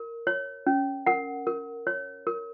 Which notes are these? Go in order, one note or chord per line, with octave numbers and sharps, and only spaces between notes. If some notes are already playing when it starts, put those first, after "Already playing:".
Already playing: A#4
C#5
C#4
A#4 F#5
A#4
C#5
A#4